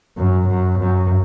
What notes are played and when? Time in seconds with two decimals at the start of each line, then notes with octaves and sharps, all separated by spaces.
0.18 F#2
0.48 F#2
0.78 F#2